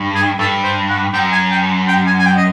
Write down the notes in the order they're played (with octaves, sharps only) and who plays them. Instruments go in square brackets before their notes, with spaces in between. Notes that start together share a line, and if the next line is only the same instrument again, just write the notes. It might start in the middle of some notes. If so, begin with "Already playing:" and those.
Already playing: [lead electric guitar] G2
[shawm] G#4
[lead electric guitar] G2 [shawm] A4
[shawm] C5
F#5
[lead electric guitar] F#2 [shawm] G5
[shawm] G#5
G5
G5
G#5
G#5
G5
D#5